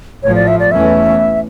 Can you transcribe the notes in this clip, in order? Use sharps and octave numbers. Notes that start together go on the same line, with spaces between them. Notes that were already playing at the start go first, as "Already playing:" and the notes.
A1 A2 F3 C#5
D5
E5
D5
E2 E3 A3 C#4 E5